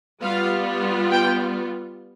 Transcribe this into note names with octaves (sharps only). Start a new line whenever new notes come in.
G3 B3 F4 F5
G5